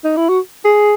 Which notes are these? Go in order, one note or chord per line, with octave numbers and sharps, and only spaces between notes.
D#4
E4
F#4
G#4